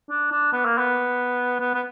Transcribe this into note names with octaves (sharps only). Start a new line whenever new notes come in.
D4
D4
B3
A#3
B3
B3
B3